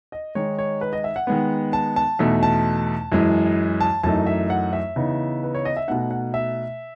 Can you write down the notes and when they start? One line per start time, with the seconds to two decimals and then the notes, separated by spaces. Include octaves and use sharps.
0.12 D#5
0.35 D#3 G#3 D#4 C#5
0.59 C#5
0.81 B4
0.93 D#5
1.04 E5
1.16 F#5
1.27 D#3 G#3 B3
1.73 A5
1.96 A5
2.19 E2 B2 A3 D#4
2.43 A5
3.12 F#2 E3 G#3
3.81 A5
4.03 F#2 E3 A3 D#4 A5
4.27 E5
4.50 F#5
4.73 E5
4.96 C#3 E3 B3 D#4
5.43 B4
5.55 C#5
5.65 D#5
5.77 E5
5.88 B2 A3 D#4 F#5
6.11 F#5
6.34 E5